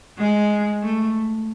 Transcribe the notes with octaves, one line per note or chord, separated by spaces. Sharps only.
G#3
A3